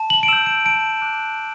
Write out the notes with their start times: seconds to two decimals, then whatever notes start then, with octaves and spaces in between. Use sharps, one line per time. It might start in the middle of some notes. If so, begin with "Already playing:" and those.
Already playing: A5
0.10 F#7
0.23 D7
0.28 E6 G6 E7
0.46 D7
0.65 A5 D7
1.02 D6 F#6
1.39 A5